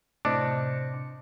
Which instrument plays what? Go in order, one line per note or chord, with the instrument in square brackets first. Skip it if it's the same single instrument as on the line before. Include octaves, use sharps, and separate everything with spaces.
[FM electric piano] A2 C3 C#7 [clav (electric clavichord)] D4 [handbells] C5 D#5 D6